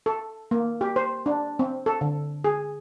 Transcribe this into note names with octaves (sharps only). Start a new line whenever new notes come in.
A4
A#3
G4
C5
D4
C4
A4
D3
G#4